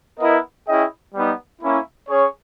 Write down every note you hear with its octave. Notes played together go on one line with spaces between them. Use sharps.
B3 E4 A#4 D#5
C#4 E4 G#4 D#5 G5
G3 B3 D#4
A#3 C#4 E4
C#4 G#4 C#5